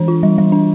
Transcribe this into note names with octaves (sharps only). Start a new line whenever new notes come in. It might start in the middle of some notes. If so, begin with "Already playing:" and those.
Already playing: E3 D4
F4
G3
G3
D4